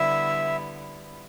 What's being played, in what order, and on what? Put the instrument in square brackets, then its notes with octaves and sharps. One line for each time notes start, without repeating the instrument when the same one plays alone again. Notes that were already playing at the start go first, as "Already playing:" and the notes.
Already playing: [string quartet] D3 G3 B3 E4 [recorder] E5